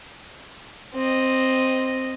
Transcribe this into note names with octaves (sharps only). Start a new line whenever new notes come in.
C4 D#5